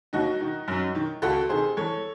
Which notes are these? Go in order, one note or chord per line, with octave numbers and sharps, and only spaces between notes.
D#2 D#4 F#4
D#3
F#2
D#3
C#2 F#4 A4
C3 D#3 G#4 C5
E2 A4 C#5